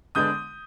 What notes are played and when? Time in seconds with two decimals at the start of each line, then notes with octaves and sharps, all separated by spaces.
0.15 D3 G#3 B3 D4 D#6 G6